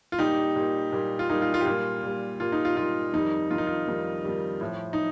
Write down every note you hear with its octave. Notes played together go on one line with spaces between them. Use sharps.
F4
A#2 G3 D#4 G4
A#2 G3
A#2 G3
F4
A#2 G3 D#4
F4
F4
G4
A#2 G3 F4
A#2 G3
A#2 G3 F4
D#4
F4
A#2 G3 F4
F2 D#3 G3 D#4
F2 D#3 G3 F4
D#4
F4
F2 D#3 G3
F2 D#3 G3
A2 F3
D#4